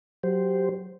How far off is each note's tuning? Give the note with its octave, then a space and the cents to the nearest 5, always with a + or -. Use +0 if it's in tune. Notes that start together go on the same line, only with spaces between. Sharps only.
F#3 +0 G4 +0 C5 -10